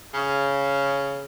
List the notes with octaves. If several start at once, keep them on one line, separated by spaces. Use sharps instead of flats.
C#3